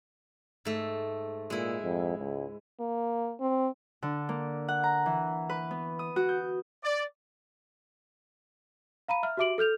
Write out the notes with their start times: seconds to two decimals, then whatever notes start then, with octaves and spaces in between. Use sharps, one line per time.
0.65 G#2 A3
1.50 A#2 G#3 E4
1.83 F2
2.18 C#2
2.80 A#3
3.40 C4
4.02 D3
4.29 A#3
4.68 F#5
4.84 A#5
5.06 E3
5.49 B4
5.71 B3
5.99 D#6
6.16 F#4
6.29 G6
6.83 D5
9.08 F5 A#5 B5 D#7
9.23 E5 F6
9.37 F#4 G4 E5 D6 D7 F#7
9.58 A4 F6 G6 F7